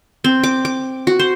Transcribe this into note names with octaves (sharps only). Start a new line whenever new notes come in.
C4
D6
D6
F#4
C5